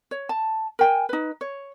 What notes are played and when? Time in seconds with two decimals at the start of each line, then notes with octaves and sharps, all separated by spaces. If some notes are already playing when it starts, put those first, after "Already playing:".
0.11 C#5
0.29 A5
0.79 A#4 G5 G#5
1.09 D#4 B4
1.41 C#5